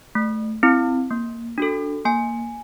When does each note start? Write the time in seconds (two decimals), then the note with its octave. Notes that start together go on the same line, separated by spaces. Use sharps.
0.15 A3
0.63 C4 E4
1.11 A#3
1.58 D4 F#4 A4
2.05 A#3 G#5